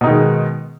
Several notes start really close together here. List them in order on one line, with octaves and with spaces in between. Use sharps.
B2 D#4 D#3 G#3